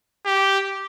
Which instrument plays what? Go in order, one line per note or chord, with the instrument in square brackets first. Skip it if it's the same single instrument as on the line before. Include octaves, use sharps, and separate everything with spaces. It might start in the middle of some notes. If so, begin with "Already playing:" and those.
[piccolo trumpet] G4